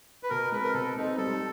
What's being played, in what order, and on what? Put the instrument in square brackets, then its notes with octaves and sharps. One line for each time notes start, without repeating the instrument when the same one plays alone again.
[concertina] B4
[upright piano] B2 [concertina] A#4
[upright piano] G#3 C4 [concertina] B4
[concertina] A#4
[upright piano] B2 [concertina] A4
[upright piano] G#3 C4 [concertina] D#4
[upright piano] G3 [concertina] A4